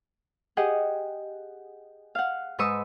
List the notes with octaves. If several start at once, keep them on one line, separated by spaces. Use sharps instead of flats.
G4 G#4 D#5 F#5
F5 F#5
G#2 G#3 B4 C#6 D#6 E6